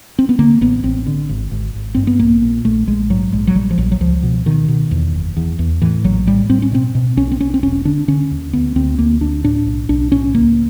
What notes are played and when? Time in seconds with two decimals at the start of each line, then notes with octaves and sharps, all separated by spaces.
0.19 C4
0.29 B3
0.39 D3 A#3
0.61 A1 B3
0.84 A1 C4
1.06 D3
1.29 G#1
1.52 G#1
1.74 G#1
1.95 G2 C4
2.07 B3
2.19 A#1 A#3
2.42 A#2
2.65 A#1 A3
2.87 A#1 G#3
3.10 G#2 F#3
3.33 A#1 G#3
3.47 F#3
3.55 A#1 G3
3.71 F3
3.78 A#1 F#3
3.92 F#3
4.00 C#2 F3
4.23 B2
4.46 B2 D#3
4.68 B2
4.91 E2
5.14 F#1
5.37 E2
5.59 E2
5.82 A2 E3
6.04 A#1 F#3
6.27 A2 G3
6.49 A2 C4
6.62 C#4
6.72 B2 C4
6.95 B2
7.17 B1 C#4
7.31 C4
7.40 B1 C#4
7.54 C4
7.63 E1 C#4
7.85 D3 D4
8.08 D3 C#4
8.31 D#2
8.53 D2 B3
8.76 D2 C4
8.99 D2 A#3
9.21 D2 D4
9.44 A2 D4
9.66 B1
9.89 B1 D4
10.11 A2 C#4
10.34 C#2 A#3